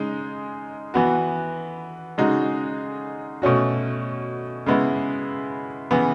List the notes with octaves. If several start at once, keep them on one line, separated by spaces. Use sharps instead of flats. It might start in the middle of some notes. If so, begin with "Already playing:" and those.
Already playing: C#3 G#3 D#4
E3 B3 F#4
C#3 G#3 D#4 F#4
B2 A3 C#4 F#4
C#3 G#3 B3 E4
C#3 E3 B3